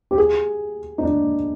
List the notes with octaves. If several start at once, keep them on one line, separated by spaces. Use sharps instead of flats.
G4
G#4
D#4
D4